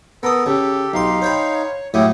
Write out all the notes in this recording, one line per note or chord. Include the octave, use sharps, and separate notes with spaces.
B3 A4 A#4 D#6
C#3 G4 A4
B1 D#4 F5 C6
C5 C#5 G5 B5
A2 F#3 A3 E4 G4 D#6